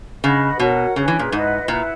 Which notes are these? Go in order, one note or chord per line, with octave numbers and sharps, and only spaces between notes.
C#3 B4 D#5 F#5 B5
B2 F#4 A#4 C#5 F#5
C#3 C#4 G#4 B4
E3
A#2
G#2 E4 B4 D#5 F#5
A#2 E4 B4 F#5